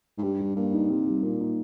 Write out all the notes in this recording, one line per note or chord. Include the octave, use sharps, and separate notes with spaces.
G#2
G2 G4
G3
G2 A#3
D#4
C3 G4
G3
A#2 A#3
D#4